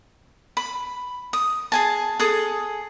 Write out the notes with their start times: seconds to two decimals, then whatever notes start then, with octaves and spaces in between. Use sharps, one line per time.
0.57 B5
1.33 D#6
1.72 G#4 G#5 A5
2.20 G#4 A4 D#6